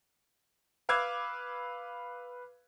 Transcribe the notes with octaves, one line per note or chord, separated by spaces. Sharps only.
B4 F5 D6 E6 F#6 G#6